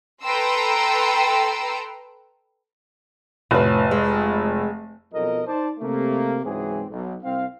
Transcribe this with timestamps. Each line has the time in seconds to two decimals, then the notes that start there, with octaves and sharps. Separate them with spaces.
0.23 A4 B4 G5 A#5 C6 E6
3.51 F1 A2 D3 B4
3.91 G#3
5.13 B1 F2 A#4 D#5
5.46 D#4 C5 D5 A5
5.80 C3 A3 A#3
6.44 C#2 G#2 E3 F#3 C4 G#4
6.90 B1
7.24 C2 C4 F5